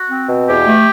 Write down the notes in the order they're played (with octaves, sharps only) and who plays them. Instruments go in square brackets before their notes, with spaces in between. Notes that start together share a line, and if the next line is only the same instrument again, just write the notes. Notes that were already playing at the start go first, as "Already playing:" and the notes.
Already playing: [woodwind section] F#4
C4
B2
E2 G4
A3